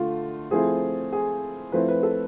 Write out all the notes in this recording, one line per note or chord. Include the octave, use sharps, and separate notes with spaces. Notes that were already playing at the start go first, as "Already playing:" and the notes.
Already playing: D3 A3 F4
F3 A3 C4 E4 G#4
G#4
F3 A3 C4 E4 B4
B4
A4